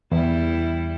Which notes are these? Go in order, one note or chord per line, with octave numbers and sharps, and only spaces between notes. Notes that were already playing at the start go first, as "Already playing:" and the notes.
E2 G3 E4